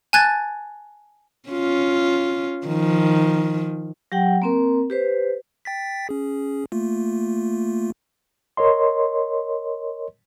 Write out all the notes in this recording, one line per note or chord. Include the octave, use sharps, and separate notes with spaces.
G#5 A5 F#6 G#6 A6
C#4 F4
D#3 F3
F#3 G4 F#5 G5
A#3 C4 A#4
G4 B4 C5
G5 A6 B6
C#4 G#4
A3 A#3 F4
A#4 C#5 D#5 C6